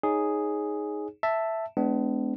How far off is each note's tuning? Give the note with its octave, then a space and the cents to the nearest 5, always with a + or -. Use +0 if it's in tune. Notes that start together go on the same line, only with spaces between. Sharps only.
D#4 +0 G#4 +0 C#5 +0
E5 +0 A5 +5
G#3 +40 B3 +40 D4 +0